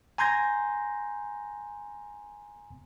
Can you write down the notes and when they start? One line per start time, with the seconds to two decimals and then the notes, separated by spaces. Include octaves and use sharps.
0.18 G#5 A#5 C6 G6 G#6 A#6